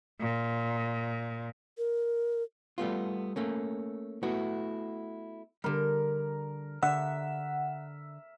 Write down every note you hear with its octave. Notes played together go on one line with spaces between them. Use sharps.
A#2
A#4
G3 A3 B3 F4
A3 A#3 C#4
A3 B3 E4 F#4
D3 G3 A#4
D3 E5 F#5